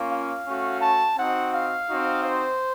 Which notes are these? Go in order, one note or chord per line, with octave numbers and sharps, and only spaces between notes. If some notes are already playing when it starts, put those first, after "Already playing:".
Already playing: A#3 C#4 F4
F5
A3 C#4 F#4
A5
C4 D#4 F#4 F#5
F5
C4 D#4 F#4
C5